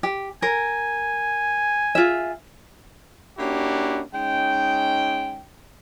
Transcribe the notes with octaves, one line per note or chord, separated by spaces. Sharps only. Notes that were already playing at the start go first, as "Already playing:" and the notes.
G4
A#4 G#5
F4 G#4 E5
A#3 C#4 D4 E4 F#4 G4
G#3 C#4 D#4 G5